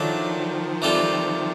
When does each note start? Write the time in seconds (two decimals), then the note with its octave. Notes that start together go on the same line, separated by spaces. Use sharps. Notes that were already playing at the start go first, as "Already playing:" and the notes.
Already playing: D#3 F3 F#3 A3 D4
0.82 E3 G3 C4 F4 A4